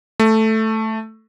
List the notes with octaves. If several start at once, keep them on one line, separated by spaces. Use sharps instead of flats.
A3